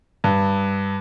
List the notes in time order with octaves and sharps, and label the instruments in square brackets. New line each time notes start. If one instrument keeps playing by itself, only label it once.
[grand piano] G2